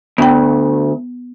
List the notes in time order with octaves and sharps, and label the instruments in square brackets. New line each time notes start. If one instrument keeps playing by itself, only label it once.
[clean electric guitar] D2 [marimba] B3 G5